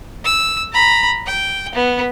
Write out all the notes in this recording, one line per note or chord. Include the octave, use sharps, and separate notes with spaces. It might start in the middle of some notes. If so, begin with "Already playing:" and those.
E6
A#5 B5
G5
B3